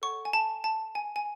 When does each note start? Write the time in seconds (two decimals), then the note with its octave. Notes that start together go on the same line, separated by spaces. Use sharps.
0.02 A4 C#5 F#5 C#6
0.25 G#5
0.33 A5
0.64 A5
0.95 G#5
1.16 G#5